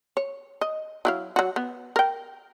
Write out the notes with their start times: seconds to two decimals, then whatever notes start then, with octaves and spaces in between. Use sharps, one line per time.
0.17 C#5
0.61 D#5
1.05 F#3 E4 F5
1.36 F#3 F#4
1.56 B3
1.96 A#4 G5